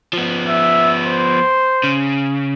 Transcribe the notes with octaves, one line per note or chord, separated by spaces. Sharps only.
F3 B3
E5
C5
C#3